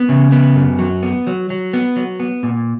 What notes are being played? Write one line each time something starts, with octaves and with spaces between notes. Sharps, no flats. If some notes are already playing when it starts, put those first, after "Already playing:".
Already playing: B3
C#3
B3
F#2
F#3
B3
F#3
F#3
B3
F#3
B3
A#2